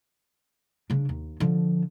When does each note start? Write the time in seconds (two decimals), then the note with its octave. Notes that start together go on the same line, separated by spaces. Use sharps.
0.90 C#3 D4
1.09 D#2
1.40 D3 F3